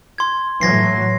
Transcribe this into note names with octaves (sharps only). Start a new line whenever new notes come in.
C6 G#6
A2 E3 F#3 G#6 A#6 C7